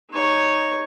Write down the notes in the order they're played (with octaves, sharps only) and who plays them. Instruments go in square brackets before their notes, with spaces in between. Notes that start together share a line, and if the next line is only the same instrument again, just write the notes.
[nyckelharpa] D#4 C#5